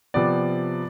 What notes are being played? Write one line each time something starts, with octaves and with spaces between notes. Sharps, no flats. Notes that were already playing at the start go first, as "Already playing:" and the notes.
C3 F3 B3 D5